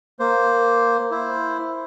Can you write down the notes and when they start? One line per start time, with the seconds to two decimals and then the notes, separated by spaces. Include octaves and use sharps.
0.20 A#3 C5
1.11 E4 C5